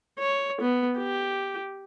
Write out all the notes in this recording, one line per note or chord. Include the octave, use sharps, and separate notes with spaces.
C#5
B3
G4